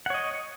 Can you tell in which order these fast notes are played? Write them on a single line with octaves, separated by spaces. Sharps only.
F#5 C#5 D#5